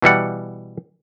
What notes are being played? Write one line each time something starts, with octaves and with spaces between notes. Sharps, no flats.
B2 E3 G3 F#5